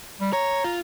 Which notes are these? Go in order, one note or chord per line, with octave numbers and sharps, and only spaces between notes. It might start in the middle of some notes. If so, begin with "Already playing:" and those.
G3
C#5 A#5
F4